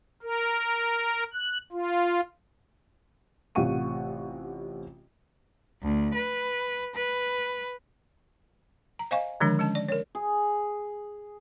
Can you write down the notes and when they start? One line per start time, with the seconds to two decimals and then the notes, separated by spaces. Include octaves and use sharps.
0.22 A#4
1.34 F#6
1.72 F4
3.55 A1 C3 F4 F#5 C#6 D#7
5.83 D2
6.14 B4
6.95 B4
8.99 A#5
9.11 C5 D#5 F5 G#5 C#6
9.40 D3 D#3 F3 G#3 D4
9.59 G#3 C#4 A5
9.75 D5
9.88 A#4 C#5
10.15 G#4